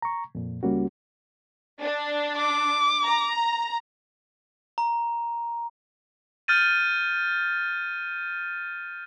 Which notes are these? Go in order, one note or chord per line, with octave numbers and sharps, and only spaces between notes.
A#5 C#6
F2 A#2
C#2 G3 A#3 C#4 F#4
D4
D6
A#5
A#5
F6 G6 A6 D#7